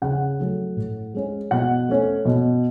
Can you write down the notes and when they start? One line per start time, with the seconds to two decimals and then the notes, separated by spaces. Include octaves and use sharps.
0.02 C#3 F#5
0.39 F#3 A3 C#4
0.77 A2
1.14 G#3 C#4
1.51 B2 F#5
1.89 A3 C#4
2.25 B2